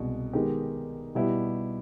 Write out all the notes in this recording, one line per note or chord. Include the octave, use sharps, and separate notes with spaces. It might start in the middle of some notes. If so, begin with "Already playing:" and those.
Already playing: C2 B2 G#3
D#3 G#3 B3 D#4 G4
B2 G3 B3 E4 G4